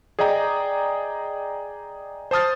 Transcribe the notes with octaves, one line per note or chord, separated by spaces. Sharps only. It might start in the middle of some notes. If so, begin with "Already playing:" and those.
G#4 D5 D#5 G5 A#5 D#6
C5 A5 D#6 F6 A6